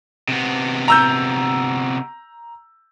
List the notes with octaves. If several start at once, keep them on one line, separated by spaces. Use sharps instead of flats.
C3 B3
A#5 E6 G6